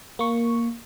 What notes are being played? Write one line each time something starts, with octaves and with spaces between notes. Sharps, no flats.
A#3 C#6